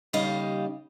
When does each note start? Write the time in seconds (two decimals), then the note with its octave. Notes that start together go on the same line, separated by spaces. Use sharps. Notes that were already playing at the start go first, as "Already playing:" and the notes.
0.13 D#2 C#3 G3 D#5 F5